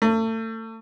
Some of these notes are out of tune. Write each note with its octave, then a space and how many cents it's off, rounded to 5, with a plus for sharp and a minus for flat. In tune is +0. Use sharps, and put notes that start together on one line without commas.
A3 +35